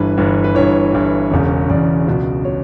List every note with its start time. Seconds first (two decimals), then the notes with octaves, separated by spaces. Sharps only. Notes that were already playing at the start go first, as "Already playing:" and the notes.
Already playing: G1 G2 E3 B4
0.18 G1 G2 E3
0.44 B4
0.55 G1 G2 E3 C#5
0.93 G1 G2 E3
1.31 E1 E2 C#3
1.70 E1 E2 C#3 D5
2.08 C#2 B2
2.45 B2 C#5